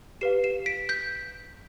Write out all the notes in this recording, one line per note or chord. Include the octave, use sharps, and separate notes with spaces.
G4 B4 F5 C7 E7
C7 E7
B6 D7
G6 B6